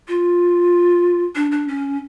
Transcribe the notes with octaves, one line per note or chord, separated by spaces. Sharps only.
F4
D4
D4
C#4